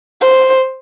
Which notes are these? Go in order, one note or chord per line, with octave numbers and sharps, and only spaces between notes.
C5